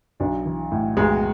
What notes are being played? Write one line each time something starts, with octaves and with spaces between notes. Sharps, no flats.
B1 B3 D4
E3
A2
B1 G#3 B3